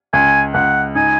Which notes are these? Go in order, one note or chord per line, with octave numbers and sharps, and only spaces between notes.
C#2 G#5
C#2 F#5
D#4 G#5